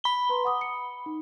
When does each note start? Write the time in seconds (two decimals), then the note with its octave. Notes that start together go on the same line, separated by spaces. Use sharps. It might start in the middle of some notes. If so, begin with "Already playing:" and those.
0.04 B5 G7
0.29 B4 A#5 C6
0.45 F#5 D6 D#6
0.61 C#7
1.06 D#4